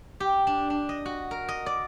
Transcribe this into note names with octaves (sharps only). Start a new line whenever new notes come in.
G4
D4
D4
D#5
F#4
A#4
D#5
D5